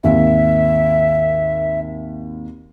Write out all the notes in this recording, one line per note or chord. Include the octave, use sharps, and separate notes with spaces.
G#1 D#2 E5